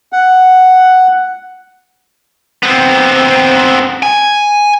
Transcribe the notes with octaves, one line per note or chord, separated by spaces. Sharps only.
F#5
B3 C4
G#5